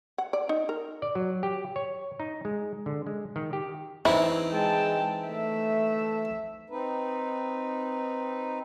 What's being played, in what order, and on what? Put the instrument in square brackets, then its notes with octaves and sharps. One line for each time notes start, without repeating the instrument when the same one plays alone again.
[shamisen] F#5
D5
D#4
A#4
[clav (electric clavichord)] D5
F#3
G4
C#5
D#4
G#3
D3
G#3
D#3
G4
[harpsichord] E3 C4 D#4 [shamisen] E4
[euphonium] G#3 [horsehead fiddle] G5 A5
[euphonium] A3 [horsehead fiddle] E5
[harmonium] C4 D#4 B4